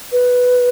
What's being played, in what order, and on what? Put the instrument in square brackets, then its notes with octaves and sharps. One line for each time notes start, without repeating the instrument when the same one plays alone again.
[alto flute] B4